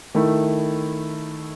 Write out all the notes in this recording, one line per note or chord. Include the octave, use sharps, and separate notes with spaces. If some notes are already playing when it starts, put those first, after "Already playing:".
D#3 A3 E4